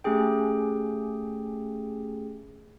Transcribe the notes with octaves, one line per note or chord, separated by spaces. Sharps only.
A3 C#4 G4 G#4 G5